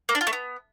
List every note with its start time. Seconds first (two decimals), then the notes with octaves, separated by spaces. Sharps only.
0.09 A#3
0.15 D4
0.21 F4
0.27 A3
0.33 B3